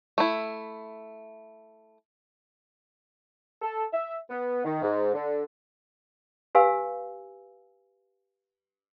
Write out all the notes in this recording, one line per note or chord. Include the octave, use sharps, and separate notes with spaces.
A3 E4
A4
E5
B3
D#3
G#2
D3
G4 B4 F5 G#5 E6